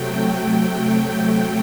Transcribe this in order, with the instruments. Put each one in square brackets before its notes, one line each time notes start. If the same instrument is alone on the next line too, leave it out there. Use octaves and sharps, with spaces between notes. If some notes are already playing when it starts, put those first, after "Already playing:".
Already playing: [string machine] C3 F#3 A3 G5
G5